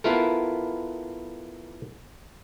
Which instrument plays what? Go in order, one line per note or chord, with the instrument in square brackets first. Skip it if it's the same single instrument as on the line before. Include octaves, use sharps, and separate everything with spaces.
[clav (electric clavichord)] B3 E4 F4 A4 A#4